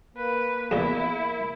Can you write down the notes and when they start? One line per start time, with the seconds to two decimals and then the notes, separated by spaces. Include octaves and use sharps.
0.17 A#3 B4
0.71 E2 A#2 E4